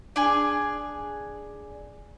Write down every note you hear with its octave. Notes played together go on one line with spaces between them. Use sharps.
D4 G#4